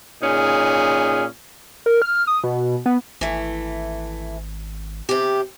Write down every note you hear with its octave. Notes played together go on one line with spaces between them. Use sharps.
A#2 C#4 D#4 G#4
A#4
F6
D#6
B2
B3
G#1 E3 A3
C3 G4